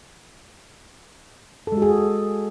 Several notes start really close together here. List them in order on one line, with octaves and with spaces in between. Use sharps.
A4 G#3 F#4 G#4